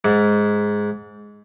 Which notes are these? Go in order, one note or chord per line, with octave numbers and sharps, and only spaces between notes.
G#2